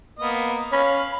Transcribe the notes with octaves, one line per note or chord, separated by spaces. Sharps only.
A#3 B3 D#5
C#4 F5 B5